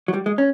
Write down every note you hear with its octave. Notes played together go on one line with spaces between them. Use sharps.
F#3
G3
G#3
C#4